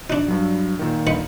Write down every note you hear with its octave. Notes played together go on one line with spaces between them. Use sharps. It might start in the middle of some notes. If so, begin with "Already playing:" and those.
D4 D#4 F#6
G2 F#3
A#2 D#3
D#4 B4 F#5